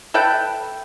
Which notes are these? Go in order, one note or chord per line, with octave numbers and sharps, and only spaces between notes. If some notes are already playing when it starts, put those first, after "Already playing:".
A4 B4 E5 G5